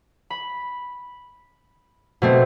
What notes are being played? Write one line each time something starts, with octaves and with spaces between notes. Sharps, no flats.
B5
B2 A3 C4